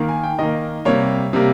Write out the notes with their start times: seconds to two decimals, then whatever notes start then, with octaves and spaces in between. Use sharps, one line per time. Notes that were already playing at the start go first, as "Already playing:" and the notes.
Already playing: D#3 A#3
0.09 G#5
0.24 G5
0.39 D#3 A#3 D#5
0.85 C3 G3 A#3 C#5
1.33 C3 G3 A#3